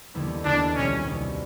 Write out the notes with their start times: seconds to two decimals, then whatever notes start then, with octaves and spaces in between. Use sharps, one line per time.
0.14 D#2 D3 G3 B3 E4
0.44 D#2 D3 G3 B3 D4 E4
0.75 C2 B2 G3 C#4
1.05 C2 B2 G3